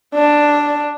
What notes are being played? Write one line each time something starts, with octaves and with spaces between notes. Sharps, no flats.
D4